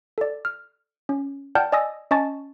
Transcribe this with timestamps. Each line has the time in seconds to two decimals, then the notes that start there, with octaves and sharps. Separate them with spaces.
0.18 A4 D5
0.45 F6
1.09 C#4
1.55 D5 F#5 G5 A5 F6 G6
1.72 D5 D#5 G#5 D#6 E6 A#6
2.11 C#4 D#5 G#5 A5 C#6 A6